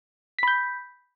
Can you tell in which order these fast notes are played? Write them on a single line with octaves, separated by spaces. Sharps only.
B6 B5 G6